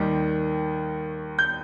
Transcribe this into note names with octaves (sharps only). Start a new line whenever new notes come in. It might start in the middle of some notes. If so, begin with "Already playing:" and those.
Already playing: D#2 D#3 G3
G6